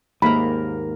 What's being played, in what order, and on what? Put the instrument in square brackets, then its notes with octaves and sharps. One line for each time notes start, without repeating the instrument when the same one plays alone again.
[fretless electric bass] D#2 G#2 [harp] A#3 A#4 [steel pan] B5